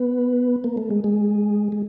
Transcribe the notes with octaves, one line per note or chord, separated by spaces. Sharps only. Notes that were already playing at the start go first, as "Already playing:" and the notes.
Already playing: B3
A#3
A3
G#3
G#3
G#3